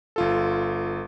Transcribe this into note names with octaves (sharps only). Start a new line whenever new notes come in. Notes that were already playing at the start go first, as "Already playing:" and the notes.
G1 F4 A4